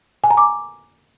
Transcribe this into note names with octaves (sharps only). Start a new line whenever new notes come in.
G#5
A#5
D6